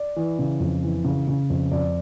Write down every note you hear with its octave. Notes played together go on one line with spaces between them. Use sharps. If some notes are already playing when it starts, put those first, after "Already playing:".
Already playing: D5
E3
C#3
F2
E3
C#3
C#3
F2
F2 D5